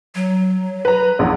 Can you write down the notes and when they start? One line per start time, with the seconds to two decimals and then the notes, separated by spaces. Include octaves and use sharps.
0.15 F#3
0.85 B4 A#5
1.19 A#1 E2